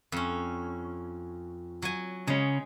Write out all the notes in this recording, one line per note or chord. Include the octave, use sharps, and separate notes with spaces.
F2 C#4
F#3 G#5
C#3 G#3 C#4